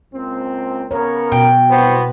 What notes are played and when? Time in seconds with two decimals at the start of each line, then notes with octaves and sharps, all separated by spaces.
0.13 C#2 A#3 C4
0.91 C#3 B3 A#4 C#5
1.32 B2 G5
1.70 C2 B3 F#4 C5